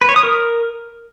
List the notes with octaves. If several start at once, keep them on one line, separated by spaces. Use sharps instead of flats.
B4
C#5
D#6
A#4